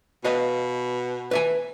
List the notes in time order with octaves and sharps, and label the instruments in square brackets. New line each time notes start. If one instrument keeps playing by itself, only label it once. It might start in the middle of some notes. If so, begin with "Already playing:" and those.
[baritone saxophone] B2 [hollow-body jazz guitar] B4 D#5 F5
[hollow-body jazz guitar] B4 E5 G#5